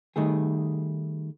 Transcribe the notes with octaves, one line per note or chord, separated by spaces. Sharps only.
D#3 G3 A3 G#4